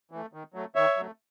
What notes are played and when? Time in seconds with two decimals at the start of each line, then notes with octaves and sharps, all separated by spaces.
0.11 E3 A3
0.33 D#3
0.54 F#3 A3
0.75 D#3 C#5 E5
0.97 F#3 A3